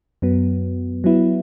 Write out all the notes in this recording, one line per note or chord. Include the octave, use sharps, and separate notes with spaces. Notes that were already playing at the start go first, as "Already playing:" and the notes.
F#2 F#3 B3
F#3 B3 E4